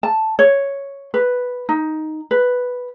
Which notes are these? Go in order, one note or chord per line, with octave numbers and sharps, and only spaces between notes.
A5
C#5
B4
D#4
B4